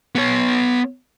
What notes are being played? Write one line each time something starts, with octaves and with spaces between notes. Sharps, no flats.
B3 C#5